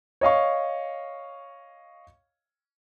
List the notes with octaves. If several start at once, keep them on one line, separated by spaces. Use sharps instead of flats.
C#5 D#5 F5 C#6